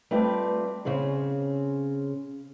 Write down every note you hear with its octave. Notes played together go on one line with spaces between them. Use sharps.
G3 A3 C4 F4 B4 D5
C#3 C4 C#4 G#4